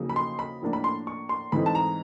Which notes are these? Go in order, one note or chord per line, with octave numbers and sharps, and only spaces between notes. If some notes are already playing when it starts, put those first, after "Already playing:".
Already playing: F2 C#3 F#3 A#3 D#4
B5
C6
B5
A2 F3 A#3 D4
B5
C6
C#6
C6
G#2 E3 A3 C4 D#4 B5
A5
A#5